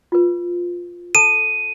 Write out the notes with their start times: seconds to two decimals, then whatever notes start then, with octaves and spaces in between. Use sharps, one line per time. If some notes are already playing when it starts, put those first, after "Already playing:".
0.12 F4 B4
1.15 A4 A5 D#7